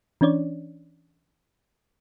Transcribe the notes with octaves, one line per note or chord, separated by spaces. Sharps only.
E3 C#4 D4 C#5 D5